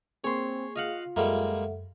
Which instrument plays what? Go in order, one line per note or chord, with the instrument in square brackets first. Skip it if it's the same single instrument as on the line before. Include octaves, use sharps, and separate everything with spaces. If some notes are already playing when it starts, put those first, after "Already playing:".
[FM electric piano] A#3 G#4 [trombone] C4 [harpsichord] C#5 C6 [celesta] C#6
[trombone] F4 [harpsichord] D#5 F5 F#5
[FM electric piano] F#2 [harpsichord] G3 G#3 A#3 [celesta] A4 E5 F#5